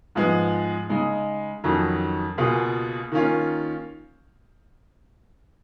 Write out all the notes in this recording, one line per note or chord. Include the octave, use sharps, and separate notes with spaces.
G#2 F3 G#3 B3
C#3 G#3 D#4
F2 D#3 F#3 C#4
C#2 B2 A#3 F4 G#4
D#3 A#3 C#4 F4